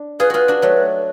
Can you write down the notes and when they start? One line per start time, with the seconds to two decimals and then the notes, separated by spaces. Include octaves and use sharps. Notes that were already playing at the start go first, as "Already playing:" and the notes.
Already playing: D4
0.20 F4 G#4 B4
0.30 F4 F#4 G#4 B4
0.48 D4 F#4
0.62 F#3 A3